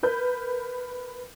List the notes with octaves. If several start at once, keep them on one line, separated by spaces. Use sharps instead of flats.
A#4 B4 G6